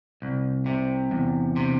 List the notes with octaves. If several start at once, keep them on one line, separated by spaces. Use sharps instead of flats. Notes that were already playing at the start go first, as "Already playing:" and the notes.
C2
C3
E2
C3